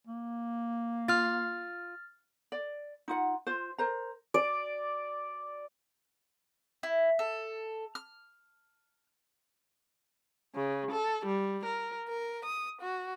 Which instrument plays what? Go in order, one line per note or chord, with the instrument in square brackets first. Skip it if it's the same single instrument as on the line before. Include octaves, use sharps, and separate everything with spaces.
[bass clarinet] A#3
[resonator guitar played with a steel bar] F4 [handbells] F6 A6
[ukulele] D5
D#4 F4 F#5
F4 C5
A#4 C5 A#5
[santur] D5
[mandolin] E4
A4
F6
[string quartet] C#3
A4
G3
A#4
A#4
D#6
F#4